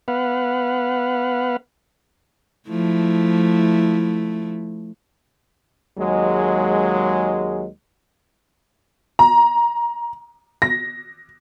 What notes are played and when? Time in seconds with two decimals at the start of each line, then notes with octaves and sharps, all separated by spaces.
0.08 B3 B4 F5 F#5
2.68 F3 A3 E4
5.98 D#2 F#3 G#3
9.19 A#5
10.62 A#6